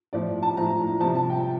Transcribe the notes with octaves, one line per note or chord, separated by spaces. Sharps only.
A2 F3 D5
A5
A2 F3 A#5
C3 F3 A5
A5
G5